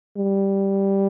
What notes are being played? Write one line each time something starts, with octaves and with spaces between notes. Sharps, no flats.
G3